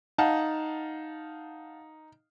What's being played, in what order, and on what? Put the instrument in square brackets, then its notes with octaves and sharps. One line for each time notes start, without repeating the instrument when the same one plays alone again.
[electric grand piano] D#4 [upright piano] F5 F#5 A5